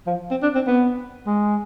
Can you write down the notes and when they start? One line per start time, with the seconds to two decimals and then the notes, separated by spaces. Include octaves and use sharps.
0.07 F3
0.31 C4
0.42 D4
0.55 C4
0.67 B3
1.27 G#3